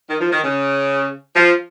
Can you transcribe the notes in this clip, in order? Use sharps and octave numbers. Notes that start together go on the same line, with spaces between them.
D#3
F3
D#3
C#3
F3